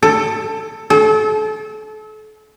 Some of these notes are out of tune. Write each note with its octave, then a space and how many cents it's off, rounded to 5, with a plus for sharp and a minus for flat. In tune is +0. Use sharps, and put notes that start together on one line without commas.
A4 +15
A4 -35